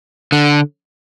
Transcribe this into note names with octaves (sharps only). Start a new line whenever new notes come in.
D3